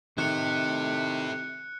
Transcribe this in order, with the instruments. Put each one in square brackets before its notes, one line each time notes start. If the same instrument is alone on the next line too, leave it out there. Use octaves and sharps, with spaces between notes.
[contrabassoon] C3 [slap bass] D#3 [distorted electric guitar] E4 A4 [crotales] F#6 C#7